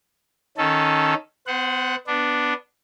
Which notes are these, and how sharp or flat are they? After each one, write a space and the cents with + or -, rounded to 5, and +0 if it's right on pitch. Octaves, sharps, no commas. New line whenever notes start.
D#3 +0 C#4 +0 A4 -5
B3 +40 C5 +0 F#5 -5
B3 +0 D4 +0